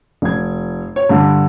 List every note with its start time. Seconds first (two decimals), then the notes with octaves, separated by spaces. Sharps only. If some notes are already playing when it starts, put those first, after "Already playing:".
0.22 F1 G#6
0.96 C#5
1.09 G2 D3